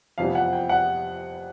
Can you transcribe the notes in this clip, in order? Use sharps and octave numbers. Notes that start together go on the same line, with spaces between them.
F2 C3 E3 G3 B3 F5
F#5
G5
F#5